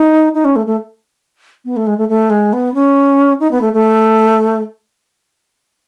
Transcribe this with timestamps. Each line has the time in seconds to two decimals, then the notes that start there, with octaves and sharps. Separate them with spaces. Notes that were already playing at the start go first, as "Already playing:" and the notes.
Already playing: D#4
0.34 D#4
0.45 C#4
0.56 A3
0.66 A3
1.65 B3
1.77 A3
1.87 G#3
1.98 A3
2.09 A3
2.30 G#3
2.53 B3
2.74 C#4
3.40 D#4
3.51 B3
3.61 A3
3.73 A3